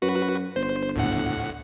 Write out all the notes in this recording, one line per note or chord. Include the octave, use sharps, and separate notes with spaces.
F#2 F#4 B4
G1 C5
D2 A2 F#5